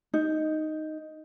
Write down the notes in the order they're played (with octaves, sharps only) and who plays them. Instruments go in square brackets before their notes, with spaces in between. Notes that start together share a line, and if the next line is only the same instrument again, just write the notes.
[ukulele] D#4